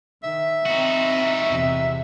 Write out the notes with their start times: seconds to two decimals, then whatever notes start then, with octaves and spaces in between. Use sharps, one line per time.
0.23 D#3 E5
0.66 C4 D#4 F#4
1.45 E2 C3